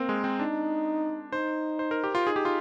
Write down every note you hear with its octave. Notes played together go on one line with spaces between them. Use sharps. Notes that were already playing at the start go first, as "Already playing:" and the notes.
Already playing: A#3 C4 A#4 C5
G#3
C4
D4 D#4
D#4 C5
C5
A#4
G4
F4
D#4 G#4
G4
F4